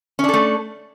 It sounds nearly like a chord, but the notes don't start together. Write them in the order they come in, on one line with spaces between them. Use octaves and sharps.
C#4 D4 A4 A3